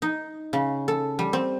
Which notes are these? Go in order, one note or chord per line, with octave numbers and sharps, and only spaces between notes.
D#4
C#3
A4
G3
C4